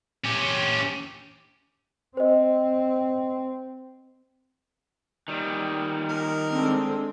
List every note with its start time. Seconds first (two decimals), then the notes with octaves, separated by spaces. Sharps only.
0.25 C#4 G4
2.17 C4 C5 D#5
5.28 D#3 G3
6.09 A#4
6.52 D3 G#3 C4 D4